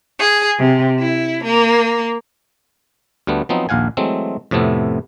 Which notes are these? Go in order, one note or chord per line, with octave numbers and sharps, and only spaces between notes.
G#4
C3
E4
A#3
D2 G3 A3 B3
F3 F#3 B3 C4 D#4
A#1 D#2 F5 F#5 G#5
E3 F#3 G#3 A3 C4
F2 A2 C3 A3 B3